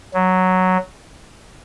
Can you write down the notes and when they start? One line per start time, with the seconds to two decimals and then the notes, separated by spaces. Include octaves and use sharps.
0.14 F#3